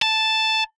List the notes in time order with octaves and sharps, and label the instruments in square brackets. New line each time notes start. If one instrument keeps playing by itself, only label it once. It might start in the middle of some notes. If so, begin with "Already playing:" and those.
[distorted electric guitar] A5